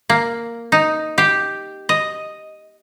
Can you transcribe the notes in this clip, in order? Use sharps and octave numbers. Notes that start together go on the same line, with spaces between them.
A#3
D#4
G4
D#5